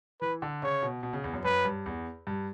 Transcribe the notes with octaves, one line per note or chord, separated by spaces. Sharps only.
E3 B4
D3
C#3 C#5
B2
B2
C#3
E2
F#2
F#2 B4
G2
E2
G2